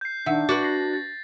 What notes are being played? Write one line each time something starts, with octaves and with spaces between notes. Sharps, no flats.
G6 C7
D#3 D4 E5 F#5 E6
F#4 B4 D5 D6 A6
A#6 C7
A6